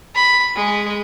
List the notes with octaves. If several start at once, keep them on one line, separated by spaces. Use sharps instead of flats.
B5
G#3